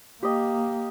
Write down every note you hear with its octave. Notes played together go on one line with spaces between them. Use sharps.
A#3 G4 D#5